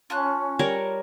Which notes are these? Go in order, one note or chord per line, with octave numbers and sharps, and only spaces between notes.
C#4 F4 A5 F#6
G3 A#4 C#5